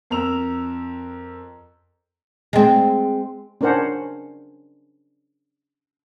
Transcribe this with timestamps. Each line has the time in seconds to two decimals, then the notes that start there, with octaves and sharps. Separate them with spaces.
0.10 F2 A#4 A#5 E6 F7
2.53 G#3 C4
3.61 C#4 D4 A#4 C5 F#5